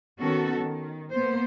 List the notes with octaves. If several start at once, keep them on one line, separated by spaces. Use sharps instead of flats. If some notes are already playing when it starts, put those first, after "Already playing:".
D#3 B3 C#4 F#4 A4
D#3
A#3 B3 C5